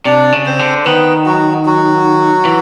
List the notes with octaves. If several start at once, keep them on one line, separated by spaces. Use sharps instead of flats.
C3 D4 D5
C#3
C4 C5
D3
D#3 B3 B4
F#3 F#4
F#3 F#4
E3